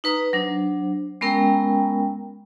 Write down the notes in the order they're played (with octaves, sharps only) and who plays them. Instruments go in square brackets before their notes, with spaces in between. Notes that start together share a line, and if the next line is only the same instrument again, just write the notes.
[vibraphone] D#4 B4 A#5 D#6
F#3 D4 C5
G#3 B3 C#4 A#4 G5 A#5